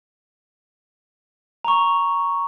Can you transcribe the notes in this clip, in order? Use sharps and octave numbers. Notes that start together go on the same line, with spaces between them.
A#5 C#6